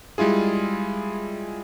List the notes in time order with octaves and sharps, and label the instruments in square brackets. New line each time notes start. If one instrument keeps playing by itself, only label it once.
[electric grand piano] G3 G#3 E4 F4 G#4